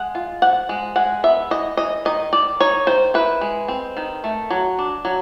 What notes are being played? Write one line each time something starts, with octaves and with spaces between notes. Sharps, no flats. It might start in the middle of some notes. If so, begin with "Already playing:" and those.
Already playing: G#3 F#5
F4
F3 F#5
G#3
G#3 F#5
B3 E5
E3 D#5
E3 D#5
D#3 D#5
D#3 D5
D#4 C#5
D#3 C5
E4 B4
G#3
C4
D#3
A3
F#3
D4
F#3